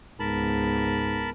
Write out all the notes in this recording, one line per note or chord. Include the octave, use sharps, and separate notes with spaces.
C#2 G#2 B3 A#4 A5 B5